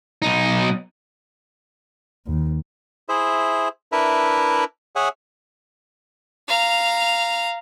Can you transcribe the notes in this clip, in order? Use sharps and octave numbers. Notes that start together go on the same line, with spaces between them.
B1 D#4
D#2
E4 G#4 C5 E5
D4 E4 A#4 B4 E5
G#4 C#5 E5 F#5 G#5
F5 A#5